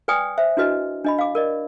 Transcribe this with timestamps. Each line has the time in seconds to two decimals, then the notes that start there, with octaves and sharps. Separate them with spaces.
0.08 B4 D5 G5 G#5 D#6
0.38 C5 E5
0.57 D4 E4 F#4 B4 D#5
1.04 D4 D#5 B5
1.19 F5 D6
1.35 A#4 D5 D#5